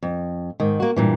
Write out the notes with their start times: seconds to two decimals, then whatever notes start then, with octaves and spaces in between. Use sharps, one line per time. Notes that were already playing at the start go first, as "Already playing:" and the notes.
0.03 F2
0.60 G#2 D#3
0.80 A#3 F#4
0.96 G2 A#2 E3